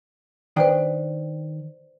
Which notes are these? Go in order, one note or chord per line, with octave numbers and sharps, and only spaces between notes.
D#3 D4 B4 C5 D5 G5